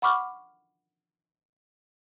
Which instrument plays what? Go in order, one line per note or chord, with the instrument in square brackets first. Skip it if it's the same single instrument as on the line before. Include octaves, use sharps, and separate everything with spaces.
[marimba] F#5 B5 C#6 D6 F6